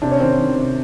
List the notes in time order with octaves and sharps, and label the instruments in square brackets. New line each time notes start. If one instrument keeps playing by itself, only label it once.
[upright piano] C3 D4
C#4
D#3 C4
C#4
D#3
C3